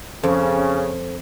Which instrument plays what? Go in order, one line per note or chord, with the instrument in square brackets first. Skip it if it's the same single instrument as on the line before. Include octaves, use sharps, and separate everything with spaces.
[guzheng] F2 [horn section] C#3 [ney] C#4 [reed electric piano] A4 C5